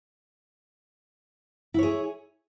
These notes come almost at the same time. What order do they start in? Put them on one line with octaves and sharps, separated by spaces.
E4 C#5 G#4